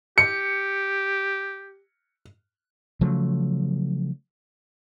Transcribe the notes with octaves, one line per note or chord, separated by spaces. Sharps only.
G4 C#7
C#3 F3 F#3 A3